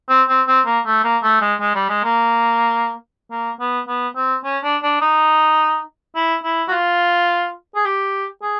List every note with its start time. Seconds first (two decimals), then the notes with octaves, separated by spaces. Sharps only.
0.09 C4
0.29 C4
0.47 C4
0.66 A#3
0.86 A3
1.04 A#3
1.23 A3
1.42 G#3
1.60 G#3
1.75 G3
1.89 G#3
2.04 A#3
3.31 A#3
3.60 B3
3.88 B3
4.16 C4
4.45 C#4
4.64 D4
4.83 D4
5.01 D#4
6.16 E4
6.44 E4
6.68 F#4
6.72 F4
7.75 G#4
7.85 G4
8.42 G#4